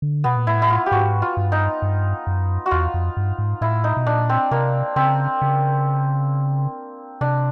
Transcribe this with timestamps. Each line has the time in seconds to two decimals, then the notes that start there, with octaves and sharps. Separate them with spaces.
0.02 D3
0.24 B2 B3
0.36 A#2
0.47 A2 E4
0.62 E4
0.70 F4
0.86 G4
0.91 G#2 F#4
1.22 F4
1.37 G2
1.52 D#4
1.82 G2
2.27 F#2
2.66 F#4
2.71 E2 F4
2.94 F2
3.17 G2
3.38 G#2
3.61 A2 E4
3.84 D#4
3.97 B2
4.06 A#2 D4
4.29 C4
4.51 C3 A#3
4.96 C#3 C4
5.42 C#3
7.21 C3 D4